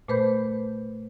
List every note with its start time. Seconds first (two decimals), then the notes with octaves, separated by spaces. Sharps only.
0.08 A#2 A3 B4 C5 B5 G6